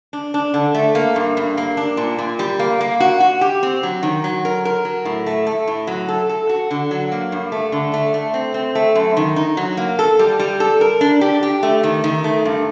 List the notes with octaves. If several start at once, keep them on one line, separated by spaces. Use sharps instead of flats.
D4
D4
D3
A3
A#3
G2
G2
A#3
D4
A#2
A#2
G3
A#3
A#3
F#4
F#4
G4
C4
F#3
D#3
F#3
A#4
A#4
F#3
A2
A3
A3
A2
F#3
A4
A4
F#4
D3
F#3
A#3
G2
A3
D3
A3
A3
C4
C4
A3
F#2
D#3
D#4
F#3
A#3
A4
G3
G3
A4
A#4
D4
G4
G4
A3
D#3
D#3
A3
G2